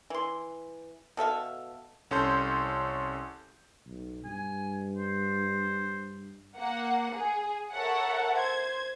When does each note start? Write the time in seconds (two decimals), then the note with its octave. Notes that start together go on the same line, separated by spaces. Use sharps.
0.10 E3 C6
1.17 B2 A4 E5 F5
2.11 C2 C#4 A4 C6 G6
3.87 B1
4.25 G2 G#5
4.96 C5
6.58 A#3 F#5
7.14 G#4
7.73 A4 A#4 C#5 E5 F#5
8.35 C5 G#6